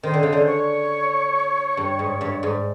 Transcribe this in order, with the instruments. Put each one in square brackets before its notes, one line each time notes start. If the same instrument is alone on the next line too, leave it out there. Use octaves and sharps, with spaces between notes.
[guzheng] D#3 [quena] C5
[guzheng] D3
C#3
D3
[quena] C#5
[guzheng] G2
G#2
G2
G#2